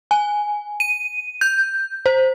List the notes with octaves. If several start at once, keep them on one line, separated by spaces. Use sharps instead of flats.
G#5
D#7
G6
C5